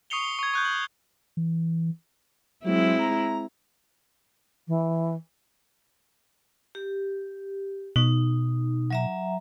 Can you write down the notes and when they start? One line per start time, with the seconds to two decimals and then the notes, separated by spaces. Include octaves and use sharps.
0.10 C#6 D#6 C7 C#7 F7 G7
0.24 G7
0.39 C#6 G#6
0.54 C#6 F#6 G6
0.65 F#7
1.37 E3
2.64 F#3 G#3 C4 E4
2.99 A#5
4.68 E3
6.75 G4
7.96 B2 D#4
8.91 F#3 E5 A#5